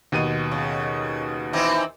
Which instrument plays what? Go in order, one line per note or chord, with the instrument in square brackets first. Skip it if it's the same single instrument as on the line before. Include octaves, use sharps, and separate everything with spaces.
[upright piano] D#2 B2 D#7
[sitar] C#3
E3 C4 D#4